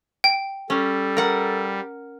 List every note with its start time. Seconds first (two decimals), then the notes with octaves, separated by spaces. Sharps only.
0.24 G5
0.70 G3 C#4 A4
1.17 A#4 F#5